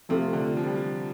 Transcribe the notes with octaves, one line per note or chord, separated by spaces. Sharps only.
C3 F3 A3 F4 A4
D3
F3
G3
F3